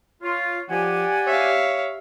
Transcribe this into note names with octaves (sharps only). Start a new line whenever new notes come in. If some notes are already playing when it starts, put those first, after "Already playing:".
F4 C#5
F3 G4 D5 F#5 G#5
C#5 E5 F5